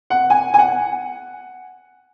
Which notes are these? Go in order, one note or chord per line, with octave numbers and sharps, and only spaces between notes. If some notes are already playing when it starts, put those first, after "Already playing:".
F#5
G#5
G#5
F#5